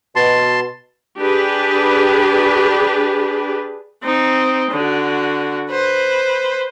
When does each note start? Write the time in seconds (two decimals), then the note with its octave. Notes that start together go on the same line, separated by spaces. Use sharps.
0.16 B2 A5 C6
1.20 D4 G4 G#4 B4
4.03 C4 D#4
4.71 D3 F#4
5.71 B4 C5